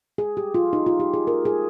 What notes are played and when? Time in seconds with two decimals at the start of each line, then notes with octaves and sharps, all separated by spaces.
0.18 G#4
0.37 G4
0.55 F4
0.73 D#4
0.86 F4
1.00 G4
1.14 G#4
1.27 A#4
1.45 G#4